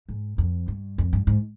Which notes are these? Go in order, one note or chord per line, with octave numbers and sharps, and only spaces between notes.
G#2
F2
G2
F2
G2
G#2